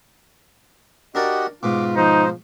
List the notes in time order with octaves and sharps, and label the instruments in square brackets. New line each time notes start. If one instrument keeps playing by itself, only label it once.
[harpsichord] D4 A#4 D5 [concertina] F#4 G4 [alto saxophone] D#5
[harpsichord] G#2 B2 [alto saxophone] F4 [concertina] D6
[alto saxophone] F3 [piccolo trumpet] D#4 [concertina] C5